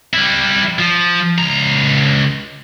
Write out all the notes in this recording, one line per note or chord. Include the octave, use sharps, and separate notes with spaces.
G3 E4
F3
C#2 A#5